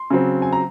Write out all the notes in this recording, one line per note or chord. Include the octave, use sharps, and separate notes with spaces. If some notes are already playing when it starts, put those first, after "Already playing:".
Already playing: C6
C#3 F#3 C4
G#5
A#5